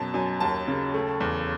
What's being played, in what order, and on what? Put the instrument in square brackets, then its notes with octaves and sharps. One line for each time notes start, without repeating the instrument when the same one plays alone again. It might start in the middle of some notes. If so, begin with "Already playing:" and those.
Already playing: [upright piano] F#2 B2 A5
F#2 G#5
D#2 A5
C#3
A3
E2